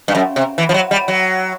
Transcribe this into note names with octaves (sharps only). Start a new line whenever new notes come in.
G2
F#2
C3
E3
F3
F#3
G3
F#3